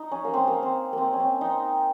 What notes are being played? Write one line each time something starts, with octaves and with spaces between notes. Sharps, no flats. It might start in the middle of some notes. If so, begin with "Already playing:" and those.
Already playing: D#4
C#4
A#3
C4
A#3
C4
A#3 C4
C#4
C4
D#4